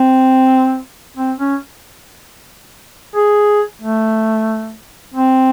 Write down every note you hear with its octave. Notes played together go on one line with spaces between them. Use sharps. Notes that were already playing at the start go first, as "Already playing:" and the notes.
Already playing: C4
C4
C#4
G#4
A3
C4